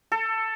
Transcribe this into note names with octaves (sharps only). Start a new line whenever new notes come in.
A4